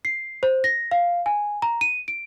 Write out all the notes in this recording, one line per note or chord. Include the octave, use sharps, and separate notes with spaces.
C7
C5
A#6
F5
G#5
A#5
D#7
D7